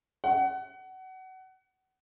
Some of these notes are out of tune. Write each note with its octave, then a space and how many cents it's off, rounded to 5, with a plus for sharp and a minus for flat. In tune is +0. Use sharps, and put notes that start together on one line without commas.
F#5 +25